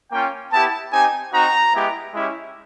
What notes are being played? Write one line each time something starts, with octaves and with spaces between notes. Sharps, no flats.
A#3 C#4 F4 G5
B3 E4 G4 A5
C4 D#4 G4 G#5
C4 D#4 F#4 A#5
G#3 B3 E4 G4
G#3 C#4 E4 G4